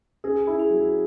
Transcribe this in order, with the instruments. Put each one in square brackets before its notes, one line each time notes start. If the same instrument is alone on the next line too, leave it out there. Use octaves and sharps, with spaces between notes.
[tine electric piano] C#4 [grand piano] G#4
[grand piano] E4
[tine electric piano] G#4
[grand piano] F#3